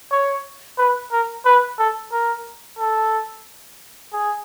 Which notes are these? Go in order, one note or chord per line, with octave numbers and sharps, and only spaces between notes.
C#5
B4
A#4
B4
A4
A#4
A4
G#4